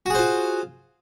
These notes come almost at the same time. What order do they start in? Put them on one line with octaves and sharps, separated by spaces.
F#4 G#4 C5 F4